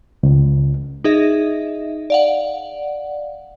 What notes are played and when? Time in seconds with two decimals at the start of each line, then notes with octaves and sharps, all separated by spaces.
0.23 C#2
1.04 D#4 G#4 D#5 E5
2.10 D5 F5 F#5